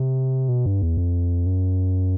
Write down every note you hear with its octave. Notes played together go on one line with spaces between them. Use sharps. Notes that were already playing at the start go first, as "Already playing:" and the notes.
Already playing: C3
B2
G2
E2
F2
F#2